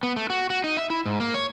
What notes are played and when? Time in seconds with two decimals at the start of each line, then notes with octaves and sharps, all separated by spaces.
0.03 B3
0.16 A3
0.30 F#4
0.50 F#4
0.64 D#4
0.77 E5
0.90 E4
1.06 G#2
1.20 A#3
1.34 C#5